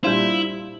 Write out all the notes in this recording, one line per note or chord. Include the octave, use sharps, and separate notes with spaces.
A#2 G3 D4 E4 F4 C5